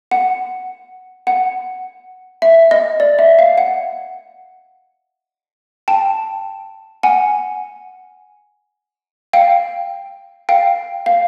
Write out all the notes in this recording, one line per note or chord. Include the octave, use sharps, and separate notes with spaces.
F#5
F#5
E5
D#5
D5
E5
F5
F#5
G5 A5
F#5 G#5
F5 G5
F5 G5
F5